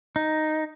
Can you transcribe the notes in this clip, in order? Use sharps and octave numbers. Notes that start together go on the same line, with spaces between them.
D#4